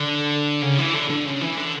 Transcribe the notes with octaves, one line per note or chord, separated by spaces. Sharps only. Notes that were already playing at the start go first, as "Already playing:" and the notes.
Already playing: D3
C#3
E3
D3
D3
C#3
E3
D3